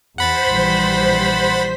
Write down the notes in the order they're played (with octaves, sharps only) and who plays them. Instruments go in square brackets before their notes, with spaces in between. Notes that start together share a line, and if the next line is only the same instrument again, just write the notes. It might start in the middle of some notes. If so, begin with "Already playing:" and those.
[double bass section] E2 [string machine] C5 B6 [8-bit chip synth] F#5 B5 A6
[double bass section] A#1 E3 G3